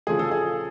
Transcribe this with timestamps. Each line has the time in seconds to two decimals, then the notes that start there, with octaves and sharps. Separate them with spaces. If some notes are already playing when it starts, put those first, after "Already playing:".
0.07 C#3 F3 A3 G#4
0.19 A4
0.31 G#4